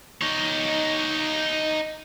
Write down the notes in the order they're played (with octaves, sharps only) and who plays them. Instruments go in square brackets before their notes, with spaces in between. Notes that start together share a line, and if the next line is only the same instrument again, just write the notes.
[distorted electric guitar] D#4 C#5